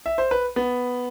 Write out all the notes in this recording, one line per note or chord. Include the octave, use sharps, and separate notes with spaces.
E5
C5
B4
B3